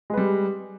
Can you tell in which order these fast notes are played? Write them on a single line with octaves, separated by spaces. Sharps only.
G#3 B4 G3